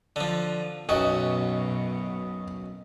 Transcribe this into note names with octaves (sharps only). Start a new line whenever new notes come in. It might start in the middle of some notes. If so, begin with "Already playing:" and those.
D3 F3
B1 F#2 B2 F#4 D#5